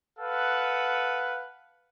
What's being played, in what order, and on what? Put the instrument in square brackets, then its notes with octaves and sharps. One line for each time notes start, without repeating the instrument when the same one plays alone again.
[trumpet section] A4 B4 F5 F#5